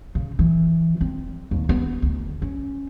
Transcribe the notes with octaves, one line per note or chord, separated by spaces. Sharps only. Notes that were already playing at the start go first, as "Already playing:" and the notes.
C#3
E3
C4
D#2
B3
D2
C#4